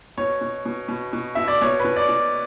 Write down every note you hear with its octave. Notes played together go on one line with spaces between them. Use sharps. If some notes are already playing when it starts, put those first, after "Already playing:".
B2 C#5
B2
B2
B2
B2
B2 E5
D5
B2 C#5
B4
B2
D5
B2